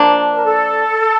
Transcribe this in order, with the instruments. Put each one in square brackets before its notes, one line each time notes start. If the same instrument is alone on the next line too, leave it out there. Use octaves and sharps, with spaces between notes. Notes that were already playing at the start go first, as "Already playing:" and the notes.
Already playing: [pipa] F3 A#3 D4
[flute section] A#4
A4